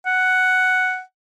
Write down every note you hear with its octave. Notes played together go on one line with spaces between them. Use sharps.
F#5